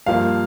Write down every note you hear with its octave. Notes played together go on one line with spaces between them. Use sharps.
G2 F3 A#3 F5